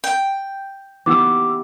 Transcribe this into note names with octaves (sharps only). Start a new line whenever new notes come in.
G5
B3 E4 G4 D6 E6